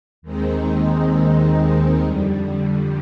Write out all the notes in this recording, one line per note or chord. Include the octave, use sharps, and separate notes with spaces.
D#2 D#3 G#3 C4 D#4
F2 D3 G3